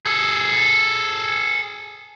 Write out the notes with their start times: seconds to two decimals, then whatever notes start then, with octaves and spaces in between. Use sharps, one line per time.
0.06 G#4 A4